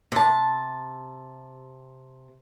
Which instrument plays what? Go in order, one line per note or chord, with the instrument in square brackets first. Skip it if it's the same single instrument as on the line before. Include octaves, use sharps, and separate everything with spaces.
[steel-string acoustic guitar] C3 A5